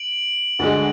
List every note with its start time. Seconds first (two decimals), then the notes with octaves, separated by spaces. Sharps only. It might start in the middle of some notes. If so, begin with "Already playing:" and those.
Already playing: D7 F#7
0.59 D2 D3 G#3